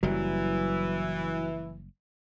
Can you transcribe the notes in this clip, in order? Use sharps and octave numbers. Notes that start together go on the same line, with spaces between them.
F#1 E3 F#3 G3